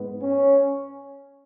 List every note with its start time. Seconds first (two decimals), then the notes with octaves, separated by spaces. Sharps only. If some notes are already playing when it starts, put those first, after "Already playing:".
Already playing: G#2 B3
0.22 C#4